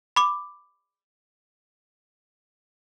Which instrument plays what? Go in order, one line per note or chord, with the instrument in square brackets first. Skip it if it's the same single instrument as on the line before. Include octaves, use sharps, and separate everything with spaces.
[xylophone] B5 D6